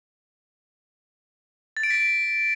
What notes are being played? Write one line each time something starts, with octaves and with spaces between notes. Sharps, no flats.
A6
D7
B6